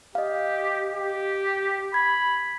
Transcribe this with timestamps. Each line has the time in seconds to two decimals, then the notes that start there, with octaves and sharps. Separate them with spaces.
0.15 G4 D#5 F5
0.94 G4
1.94 B5 G#6